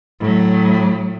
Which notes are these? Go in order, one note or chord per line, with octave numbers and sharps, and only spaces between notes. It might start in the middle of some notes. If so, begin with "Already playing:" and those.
A2 F#3